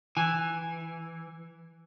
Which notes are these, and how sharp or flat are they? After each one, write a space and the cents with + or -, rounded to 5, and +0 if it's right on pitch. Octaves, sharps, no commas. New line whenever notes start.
E3 +0 G#5 +0